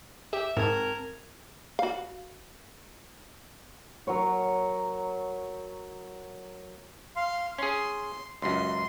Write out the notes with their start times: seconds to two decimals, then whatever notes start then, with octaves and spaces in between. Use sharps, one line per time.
0.33 G4 E5
0.57 G#2 C4 A#4 A5 G#6
1.79 F#4 F5
4.07 F#3 A#4 C#5
7.16 F5 C6
7.58 C#4 G#4 C6
8.42 C#2 F#2 C6